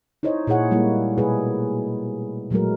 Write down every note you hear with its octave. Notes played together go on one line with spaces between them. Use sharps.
D#4 E4 C5 C#5 D#5
A#2 E4 G#4 C#5 F#5
G3 G#3 A#3 E4
B2 A3 G#4 B4
A#2 F#3 G#3 A3 A#4